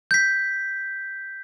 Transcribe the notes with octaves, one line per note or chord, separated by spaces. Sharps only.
G6 B6